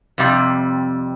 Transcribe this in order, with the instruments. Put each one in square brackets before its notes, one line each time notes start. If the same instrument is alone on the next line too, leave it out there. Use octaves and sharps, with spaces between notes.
[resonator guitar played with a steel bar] F2 C3 G3